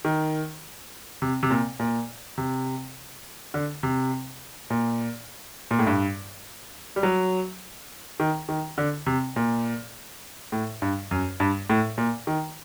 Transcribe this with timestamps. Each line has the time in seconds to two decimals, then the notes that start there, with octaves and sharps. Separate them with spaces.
0.05 D#3
1.22 C3
1.43 C3
1.51 A#2
1.80 A#2
2.38 C3
3.54 D3
3.83 C3
4.70 A#2
5.71 A#2
5.79 A2
5.87 G2
6.96 G3
7.03 F#3
8.20 D#3
8.49 D#3
8.78 D3
9.07 C3
9.36 A#2
10.52 A2
10.82 G2
11.11 F#2
11.40 G2
11.70 A2
11.98 A#2
12.27 D#3